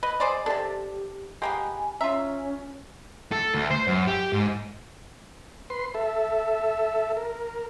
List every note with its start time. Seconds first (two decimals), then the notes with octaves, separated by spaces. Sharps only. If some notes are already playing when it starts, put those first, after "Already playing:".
0.03 B4 D#5
0.20 G#4 C5 D5 D#5 B5
0.46 C3 D4 G4 A4 D5 A5
1.42 G#3 A#3 B3 G4 G5 G#5
2.01 C#4 F4 E5 A#5
3.32 A4
3.54 D2
3.71 C5
3.87 F#2
4.07 G4
4.33 G#2
5.70 B4 C6
5.94 A4 E5
7.17 A#4